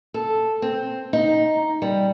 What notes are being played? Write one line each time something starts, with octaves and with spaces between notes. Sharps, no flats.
A4
C4
D#4
G3